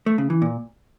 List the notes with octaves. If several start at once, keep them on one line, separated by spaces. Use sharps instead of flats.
A3
C#3
E3
A#2